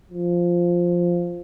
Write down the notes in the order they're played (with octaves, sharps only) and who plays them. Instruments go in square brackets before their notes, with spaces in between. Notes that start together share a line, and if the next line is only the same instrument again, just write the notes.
[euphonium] F3